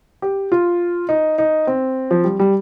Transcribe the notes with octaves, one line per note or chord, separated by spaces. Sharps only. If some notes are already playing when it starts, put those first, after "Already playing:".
G4
F4
D#4
D#4
C4
F3
G3
G3